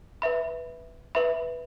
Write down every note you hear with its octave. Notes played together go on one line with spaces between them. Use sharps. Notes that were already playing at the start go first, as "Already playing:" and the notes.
B4 E5 B5
B4 E5 B5